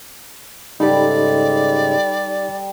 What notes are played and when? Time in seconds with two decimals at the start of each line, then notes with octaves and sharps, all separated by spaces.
0.80 G#2 C#3 G3 G#3 D#4 G4 A4 D5